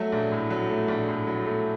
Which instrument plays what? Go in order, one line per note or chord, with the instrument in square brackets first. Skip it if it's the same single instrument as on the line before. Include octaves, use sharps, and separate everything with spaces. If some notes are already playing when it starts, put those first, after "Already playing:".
Already playing: [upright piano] F#3 A3
A#1
A2
F#3
A3
A#1
A2
F#3
A3